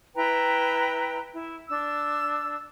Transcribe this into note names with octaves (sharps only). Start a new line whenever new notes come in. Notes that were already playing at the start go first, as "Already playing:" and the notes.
E4 B4 G5 A#5
E4
D4 E6